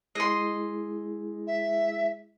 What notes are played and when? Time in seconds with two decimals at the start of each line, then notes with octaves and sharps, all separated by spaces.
0.15 G#3 E4 G#4 D#5 C6
1.47 E5